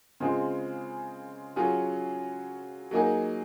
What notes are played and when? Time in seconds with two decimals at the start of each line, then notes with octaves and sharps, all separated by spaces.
0.20 C#3 G#3 C4 F4 G#4
1.56 F#3 C#4 F4 G#4
2.91 F#3 A#3 D#4 G#4